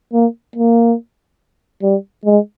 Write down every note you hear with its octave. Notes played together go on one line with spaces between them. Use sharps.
A#3
A#3
G3
G#3